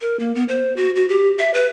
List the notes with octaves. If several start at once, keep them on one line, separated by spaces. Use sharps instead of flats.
A#4
A#3
B3
C5
F#4
F#4
G4
E5
B4